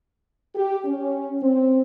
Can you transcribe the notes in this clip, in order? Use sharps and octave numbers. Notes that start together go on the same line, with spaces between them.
G4
C#4
C4